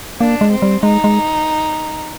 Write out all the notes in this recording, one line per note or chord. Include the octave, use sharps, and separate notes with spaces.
A#3 D4
G#3
C4
G3
G#3 D#4
G#3